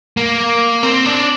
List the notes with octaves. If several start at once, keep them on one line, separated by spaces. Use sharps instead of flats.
A#3
C4
D4